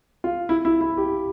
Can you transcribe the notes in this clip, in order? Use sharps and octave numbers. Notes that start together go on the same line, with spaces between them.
F4
E4
E4
E4
G4